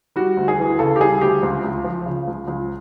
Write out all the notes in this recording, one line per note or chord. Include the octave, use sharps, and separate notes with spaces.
G3 F#4
D2
G#4
E3
C#3 A4
G4
G3 G#4
D2 G4
C#2
C#2
F3
C#3
C#2
C#2